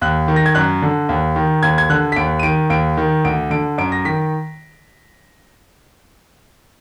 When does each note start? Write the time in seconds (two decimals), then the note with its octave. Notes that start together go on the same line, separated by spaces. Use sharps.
0.01 D#2 F#6
0.28 D#3
0.36 A#6
0.46 G#6
0.55 F#2 F#6
0.82 D3
1.09 D#2
1.36 D#3
1.63 D#2 G#6
1.78 G#6
1.90 D3 F#6
2.12 B6
2.16 D#2 D7
2.39 D#7
2.43 D#3 D7
2.70 D#2 D7
2.97 D#3
3.25 D2 D7
3.50 D3 D7
3.78 F#2 D7
3.92 A#6
4.05 D#3 B6